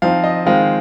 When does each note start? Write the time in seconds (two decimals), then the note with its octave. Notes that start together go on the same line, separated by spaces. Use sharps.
0.02 F3 C4 D#4 F5
0.24 D#5
0.46 D#3 G#3 C4 F4 F5